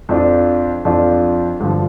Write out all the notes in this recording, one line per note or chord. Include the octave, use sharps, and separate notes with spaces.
F2 F3 D4 F4
F2 F3 D4 F4
G2 D3 F3